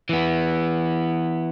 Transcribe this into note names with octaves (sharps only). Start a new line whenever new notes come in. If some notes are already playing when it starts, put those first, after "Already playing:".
E3 B3